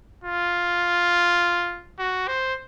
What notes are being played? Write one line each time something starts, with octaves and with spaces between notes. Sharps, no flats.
F4
F#4
C5